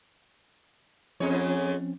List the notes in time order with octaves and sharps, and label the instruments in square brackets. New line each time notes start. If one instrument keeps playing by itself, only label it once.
[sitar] F2 G#3 C#5 [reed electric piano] F3 C4 C#4